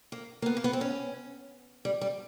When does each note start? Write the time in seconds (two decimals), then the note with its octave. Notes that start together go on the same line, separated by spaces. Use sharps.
0.12 A#3
0.42 A#3
0.46 B3
0.57 A#3
0.64 B3
0.73 C4
0.81 C#4
1.85 G3
2.01 G3